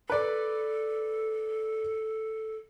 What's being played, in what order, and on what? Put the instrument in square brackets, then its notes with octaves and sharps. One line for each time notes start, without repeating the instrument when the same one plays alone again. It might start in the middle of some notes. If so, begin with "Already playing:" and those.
[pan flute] A4 [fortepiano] B4 D5